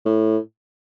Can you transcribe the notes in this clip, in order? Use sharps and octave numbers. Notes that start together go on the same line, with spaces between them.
A2